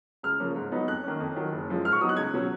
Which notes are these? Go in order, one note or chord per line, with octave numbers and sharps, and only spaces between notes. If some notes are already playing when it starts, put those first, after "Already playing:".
C#2 F6
C#3 F3 A#3 C#4
G#2
F#3 B3 D#4
F2 F#6
D#3 A#3 C#4
F2
D#3 F#3
F#1
F#2 F3 G#3
G#2 F6
C#6
F#3 B3 D#4 D#6
F#6
C#2 G#6
B2 F#3 C#4